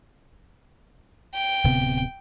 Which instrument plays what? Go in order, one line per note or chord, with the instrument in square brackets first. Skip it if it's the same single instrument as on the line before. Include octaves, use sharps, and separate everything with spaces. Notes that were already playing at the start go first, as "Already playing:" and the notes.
[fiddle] G5
[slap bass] D1 C3 B3